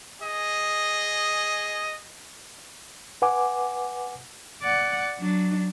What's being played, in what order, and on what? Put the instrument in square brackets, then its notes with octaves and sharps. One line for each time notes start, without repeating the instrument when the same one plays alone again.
[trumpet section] G#4 D#5
[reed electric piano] B4 F#5 G#5 D6
[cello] D5 F#5
F#3 D4